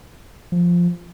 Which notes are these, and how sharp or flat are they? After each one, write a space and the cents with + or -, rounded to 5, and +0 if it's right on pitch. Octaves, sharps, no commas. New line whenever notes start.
F3 +0